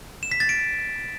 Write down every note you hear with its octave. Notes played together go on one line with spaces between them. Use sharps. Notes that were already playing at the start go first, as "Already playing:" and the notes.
E7
B6
A6
D7